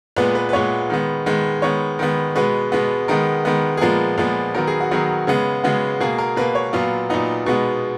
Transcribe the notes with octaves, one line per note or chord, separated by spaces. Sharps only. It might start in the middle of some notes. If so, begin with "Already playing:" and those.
A#2 G#3 B3 B4
B4
B4
A#2 G#3 B3 C#5
D#3 G#3 B3
D#3 G#3 B3
D#3 G#3 B3 C#5
D#3 G#3 B3
B2 G#3 B3 B4
B2 G#3 B3
D#3 G#3 B3 A#4
D#3 G#3 B3
G#4
A#2 F3 G#3 B3 A#4
A#2 F3 G#3 B3
D#3 F#3 B3 A#4
G#4
F#4
D#3 F#3 B3 G#4
C#3 G#3 B3
C#3 G#3 B3 F#4
B2 A#3 G#4
A#4
B2 A#3 B4
C#5
A#2 F#3 B3 F4
A#2 F#3 B3 D#4
B2 G#3 B3